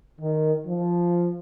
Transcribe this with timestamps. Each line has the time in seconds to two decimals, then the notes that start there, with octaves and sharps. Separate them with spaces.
0.21 D#3
0.66 F3